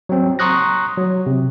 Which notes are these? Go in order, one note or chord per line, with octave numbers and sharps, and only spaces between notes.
F#3 C4
A#5 C6 C#6 D#6 F#6 A#6
F#3
C3